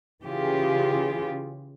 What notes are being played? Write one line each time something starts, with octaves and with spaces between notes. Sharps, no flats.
C#3 E3 F4 G4 G#4